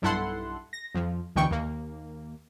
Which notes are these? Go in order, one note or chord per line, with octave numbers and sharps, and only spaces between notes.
B1 G2 E4 A4 F#5 C6
A#6
F2 F3
D2 B2 D3 E3 G5 C#6
D#2 A#3